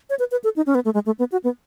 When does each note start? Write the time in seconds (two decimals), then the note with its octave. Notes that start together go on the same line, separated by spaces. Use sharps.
0.10 C#5
0.19 B4
0.31 B4
0.44 A4
0.56 D#4
0.66 C#4
0.75 B3
0.85 A3
0.94 G#3
1.06 A3
1.19 B3
1.32 F#4
1.44 B3